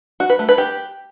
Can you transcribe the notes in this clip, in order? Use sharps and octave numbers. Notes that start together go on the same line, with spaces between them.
F#4
B4
A3
B4
G4